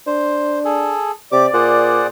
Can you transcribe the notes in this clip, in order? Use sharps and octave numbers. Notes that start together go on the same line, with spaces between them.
D4 C5
G#4 A4
C3 G4 D5 D6
A#2 G#4 C5 F#5